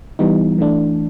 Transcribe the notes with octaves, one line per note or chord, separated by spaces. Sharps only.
E3 G3 B3 D#4
E3 A3 D4